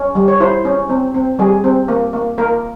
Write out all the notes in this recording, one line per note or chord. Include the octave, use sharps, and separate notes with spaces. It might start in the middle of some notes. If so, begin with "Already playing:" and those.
Already playing: C#4
G3
C#5
E4 C5
C#4
C4
C4
G3 G#4
C4
A#3
A#3
A#3 A#4